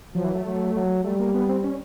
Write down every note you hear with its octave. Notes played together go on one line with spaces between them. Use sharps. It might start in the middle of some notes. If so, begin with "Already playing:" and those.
F3 F#3
E3
A3
F#3
F#3
G3 A3
A#3
B3
C4
C#4